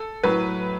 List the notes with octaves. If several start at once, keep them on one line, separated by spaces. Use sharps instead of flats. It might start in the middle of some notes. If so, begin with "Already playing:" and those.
Already playing: A4
A2 F#3 B4